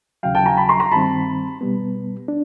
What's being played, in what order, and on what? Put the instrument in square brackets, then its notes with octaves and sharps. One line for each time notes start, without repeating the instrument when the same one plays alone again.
[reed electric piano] D#2 C#3 F#3 [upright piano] F5 G5
[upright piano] G5 A5
G#5 A#5
A5 B5
A#5 C6
A#5 C6
[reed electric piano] G2 D#3 G3 C4 [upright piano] A5 B5
[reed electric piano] B2 G3 B3
D4